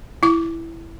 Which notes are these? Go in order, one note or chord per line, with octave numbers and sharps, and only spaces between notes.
E4 D6